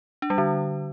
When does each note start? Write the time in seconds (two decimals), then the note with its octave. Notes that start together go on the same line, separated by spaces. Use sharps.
0.22 D4
0.30 G3
0.38 D3